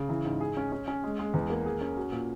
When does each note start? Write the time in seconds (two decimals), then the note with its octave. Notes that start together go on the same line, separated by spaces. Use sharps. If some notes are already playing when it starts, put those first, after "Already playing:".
Already playing: C#3
0.09 E3
0.26 G#2
0.41 G#4
0.57 C#4
0.72 C#4
0.88 C#4
1.04 G#3
1.19 G#3
1.34 E2
1.50 A#3
1.66 G#4
1.81 C#4
1.97 F#4
2.12 A#2